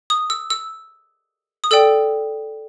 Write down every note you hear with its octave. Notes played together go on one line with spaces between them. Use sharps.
D#6
E6
E6
D#6
A4 D5 G5 E6